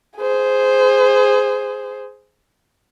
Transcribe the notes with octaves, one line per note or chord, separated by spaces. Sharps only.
G#4 C5